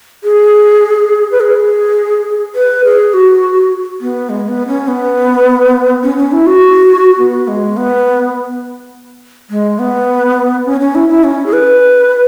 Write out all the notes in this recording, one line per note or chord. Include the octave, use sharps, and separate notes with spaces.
G#4
B4
G#4
B4
G#4
F#4
B3
G#3
B3
C#4
B3
C#4
C#4
E4
F#4
B3
G#3
B3
G#3
B3
C#4
C#4
E4
E4
C#4
G#4
B4